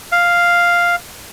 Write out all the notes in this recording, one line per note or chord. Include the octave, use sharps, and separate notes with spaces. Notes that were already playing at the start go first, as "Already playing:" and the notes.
F5